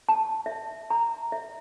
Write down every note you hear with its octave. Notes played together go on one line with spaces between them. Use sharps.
A5
E5
A#5
E5